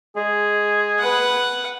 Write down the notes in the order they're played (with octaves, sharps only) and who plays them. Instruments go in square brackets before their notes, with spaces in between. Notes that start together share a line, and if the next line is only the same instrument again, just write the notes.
[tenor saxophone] G#3 [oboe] G#4
[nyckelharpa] B4 F#5